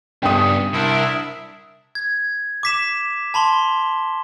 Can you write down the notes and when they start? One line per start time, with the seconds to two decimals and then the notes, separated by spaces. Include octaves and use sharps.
0.23 G2 C#3 B3 G5 D#6
0.73 C2 D4 E4 A#4 E5
1.95 G#6
2.63 D6 B6 E7
3.34 A5 B5 C6 G7